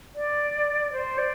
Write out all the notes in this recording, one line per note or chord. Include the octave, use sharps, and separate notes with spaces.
D5
C5
D5